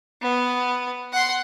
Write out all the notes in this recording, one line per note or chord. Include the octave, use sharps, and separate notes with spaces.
B3
F#5 C6